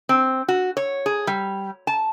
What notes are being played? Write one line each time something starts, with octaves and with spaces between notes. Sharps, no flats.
C4
F#4
C#5
G#4
G3
A5